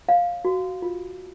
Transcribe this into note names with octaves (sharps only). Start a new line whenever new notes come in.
C#5 F5
F#4
F4